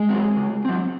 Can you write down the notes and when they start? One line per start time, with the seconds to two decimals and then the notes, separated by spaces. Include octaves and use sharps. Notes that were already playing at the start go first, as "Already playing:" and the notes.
Already playing: G#3 G#4
0.09 F#3 C4
0.37 C#3
0.65 F#3 C4